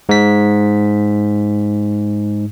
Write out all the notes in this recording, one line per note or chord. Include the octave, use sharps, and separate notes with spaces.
G#2 B6